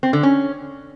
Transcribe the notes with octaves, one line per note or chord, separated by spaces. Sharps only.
C4
D3
C#4